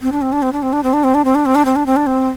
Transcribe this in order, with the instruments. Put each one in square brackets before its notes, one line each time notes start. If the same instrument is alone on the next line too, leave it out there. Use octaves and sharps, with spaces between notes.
[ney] C4
D4
C4
D4
C4
D4
C4
D4
C4
D4
C4
D4
C4
D4
C4
D4
C4
D4
C4
D4
C4